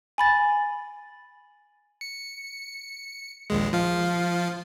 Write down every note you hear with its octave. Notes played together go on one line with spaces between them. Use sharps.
G#5 B5 A6
C#7
A#1 D#2 G#3
F3 F5